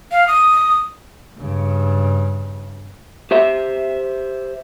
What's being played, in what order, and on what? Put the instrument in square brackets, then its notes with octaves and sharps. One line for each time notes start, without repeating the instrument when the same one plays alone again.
[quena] F5
D#6
[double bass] G2 C#3
[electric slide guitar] G4 C5 E5